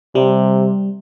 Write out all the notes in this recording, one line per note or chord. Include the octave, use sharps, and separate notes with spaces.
C3 G3